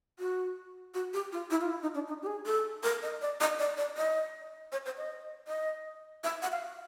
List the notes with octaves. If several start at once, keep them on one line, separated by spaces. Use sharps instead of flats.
F#4
F#4
G4
F4
E4
F4
E4
D#4
D4
D#4
G4
G#4
A4
A#4
D#5
D5
D#5
D5
D5
D#5
C#5
C5
D#5
D#5
E5
F#5
F5